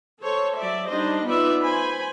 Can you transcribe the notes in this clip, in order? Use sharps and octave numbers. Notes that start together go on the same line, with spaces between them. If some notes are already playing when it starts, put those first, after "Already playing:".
A4 C5 C#5
F#3 D5 E5
G3 D4 D#4 C5 D#5
B3 D#4 F4 B4 D5 E5
C5 G#5 B5